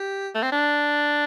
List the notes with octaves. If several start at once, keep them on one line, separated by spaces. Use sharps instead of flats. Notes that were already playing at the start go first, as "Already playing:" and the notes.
Already playing: G4
A3
C4
D4